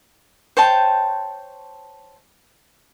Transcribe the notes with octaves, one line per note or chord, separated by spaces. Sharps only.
C5 C#5 G5 A5